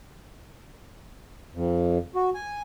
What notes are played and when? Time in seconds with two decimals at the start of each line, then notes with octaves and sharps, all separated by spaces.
1.54 F2
2.15 F#4
2.35 G#5